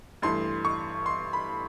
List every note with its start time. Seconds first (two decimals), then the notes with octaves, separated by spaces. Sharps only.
0.22 G2 E3 A3 C6
0.65 C#6
1.06 C6
1.33 B5